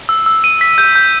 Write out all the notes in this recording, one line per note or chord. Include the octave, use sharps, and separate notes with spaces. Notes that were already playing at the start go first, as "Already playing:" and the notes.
E6
E6
D#7
B6
G6
G6